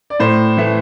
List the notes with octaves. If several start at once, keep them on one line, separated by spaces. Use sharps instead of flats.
D5
A2 C5
E3 A3